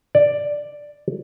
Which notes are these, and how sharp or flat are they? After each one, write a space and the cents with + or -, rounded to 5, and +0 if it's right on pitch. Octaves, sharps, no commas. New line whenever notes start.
D5 +5